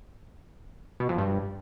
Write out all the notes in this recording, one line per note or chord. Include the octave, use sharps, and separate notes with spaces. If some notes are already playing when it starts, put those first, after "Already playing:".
B2
F2
G2